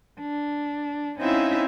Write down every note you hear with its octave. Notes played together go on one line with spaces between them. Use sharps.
D4
C4 C#4 D#4 E4 E5 F5